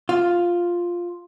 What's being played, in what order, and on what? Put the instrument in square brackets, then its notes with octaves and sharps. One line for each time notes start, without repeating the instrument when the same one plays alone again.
[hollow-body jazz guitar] F4